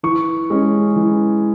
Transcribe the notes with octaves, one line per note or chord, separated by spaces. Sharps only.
E3 C#6
G#3 C#4
E3